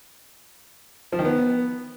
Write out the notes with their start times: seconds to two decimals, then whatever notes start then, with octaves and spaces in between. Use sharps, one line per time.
1.12 F3
1.19 D#3
1.25 B3